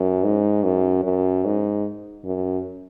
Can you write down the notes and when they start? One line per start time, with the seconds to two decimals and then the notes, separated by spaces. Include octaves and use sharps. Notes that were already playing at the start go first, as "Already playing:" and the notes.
Already playing: F#2
0.24 G#2
0.64 F#2
1.05 F#2
1.45 G#2
2.25 F#2